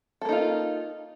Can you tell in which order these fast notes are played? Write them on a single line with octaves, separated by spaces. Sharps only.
A4 A#3 D#4 F4